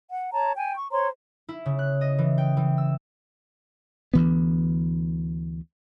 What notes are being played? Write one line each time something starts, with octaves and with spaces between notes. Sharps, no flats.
F#5
C#5 A5 A#5
G5 G#5
C#6
C5 C#5 A#5 C6
E4
C#3
F#6
D#5
E3
G5
E3
E6
D2 E3 B3